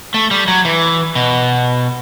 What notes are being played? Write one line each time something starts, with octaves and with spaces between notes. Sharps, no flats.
A3
G3
F#3
E3
B2